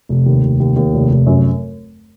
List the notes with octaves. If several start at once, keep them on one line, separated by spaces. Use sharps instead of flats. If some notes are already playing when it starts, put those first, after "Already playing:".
F1
D#2
F1
D#2
D#2
F1
F1
F#2